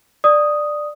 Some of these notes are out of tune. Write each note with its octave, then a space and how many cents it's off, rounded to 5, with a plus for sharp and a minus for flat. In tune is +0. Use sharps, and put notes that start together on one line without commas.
D5 +10 D#6 +0